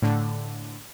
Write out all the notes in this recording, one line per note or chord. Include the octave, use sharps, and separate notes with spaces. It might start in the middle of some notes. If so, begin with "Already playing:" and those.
A2 D3